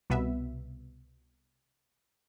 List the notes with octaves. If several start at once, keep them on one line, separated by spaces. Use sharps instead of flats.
C2 B2 B3 B4 E5